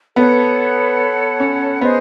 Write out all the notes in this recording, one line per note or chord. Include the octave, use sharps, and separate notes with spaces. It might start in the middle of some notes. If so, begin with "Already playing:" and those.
B3 A4 C#5 F#5 B5
C#4
B3 G#4 C5 D#5